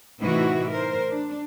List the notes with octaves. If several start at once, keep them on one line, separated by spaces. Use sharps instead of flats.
A2 C3 E3 D#4 E4 F#4
A#4 C5
D4